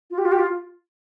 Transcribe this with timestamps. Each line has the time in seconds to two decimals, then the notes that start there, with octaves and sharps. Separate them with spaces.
0.11 F4
0.18 G4
0.25 F4
0.32 G4
0.39 F4